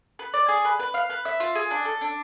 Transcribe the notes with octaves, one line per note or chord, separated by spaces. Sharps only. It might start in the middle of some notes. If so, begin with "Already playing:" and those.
B4
D5
G#4
B4
B4
F5
B4
E5
F4
G#4
D4
A4
D4